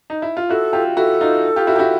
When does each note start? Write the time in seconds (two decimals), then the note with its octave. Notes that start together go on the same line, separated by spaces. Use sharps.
0.10 D#4
0.22 E4
0.37 F4
0.49 E4 F#4 A4
0.73 F4 G4
0.97 E4 F#4 A4
1.21 D#4 F4
1.56 F4 G4
1.67 E4 F#4
1.76 G4
1.79 E4 F#4